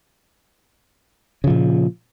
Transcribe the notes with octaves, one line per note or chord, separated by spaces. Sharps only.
A#2 C#3 F3